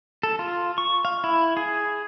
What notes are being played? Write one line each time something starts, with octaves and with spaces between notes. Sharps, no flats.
A4
F4
C#6
F5
E4
G#4